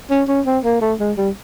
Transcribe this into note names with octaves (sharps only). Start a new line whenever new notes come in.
C#4
C#4
C4
A#3
A3
G#3
G3